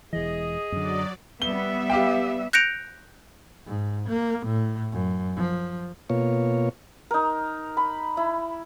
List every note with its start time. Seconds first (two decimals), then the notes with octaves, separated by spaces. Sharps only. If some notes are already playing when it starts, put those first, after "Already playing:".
0.13 E1 E3 G#4 D#5
0.72 F#2 D3 F#3 D5
1.42 G3 B3 E5 G7
1.90 G4 F5 G5
2.53 F#6 G6 A#6 C#7 D7 F7
3.67 G#2
4.09 A#3
4.47 A2
4.93 F#2
5.36 F3
6.10 B2 A#3 F4 C#5
7.11 D#4 A#4
7.77 B5
8.17 E4